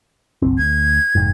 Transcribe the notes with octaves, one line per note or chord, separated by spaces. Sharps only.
F#1 B1 C4
D2 G#6
F1 G#2